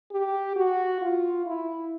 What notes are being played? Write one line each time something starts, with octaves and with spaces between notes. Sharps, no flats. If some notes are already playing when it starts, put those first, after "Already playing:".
G4
F#4
F4
E4